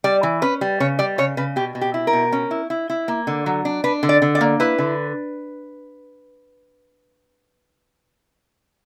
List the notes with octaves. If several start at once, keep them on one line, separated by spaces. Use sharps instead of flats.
G3 D5
E3
C#4 B4
G3
C#3 C#5
G3 D5
C#3 C#5
C#3 B4
B2 G4
B2
G4
E4
A#4
B2
C#4
E4
E4
E4
A#3
D3
F#3
D4
D4 B4
D3
D5
D3
D5
A#3
E4 B4
D3